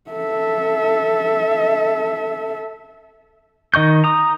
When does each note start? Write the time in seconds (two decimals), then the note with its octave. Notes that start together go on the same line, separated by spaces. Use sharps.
0.10 A4 E5
3.74 D#3 D#5 C#6 G6
4.04 A#5 D#6